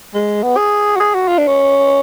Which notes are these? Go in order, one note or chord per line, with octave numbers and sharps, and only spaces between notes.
G#3
B3
G#4
F#4
G#4
F#4
F4
D4
C#4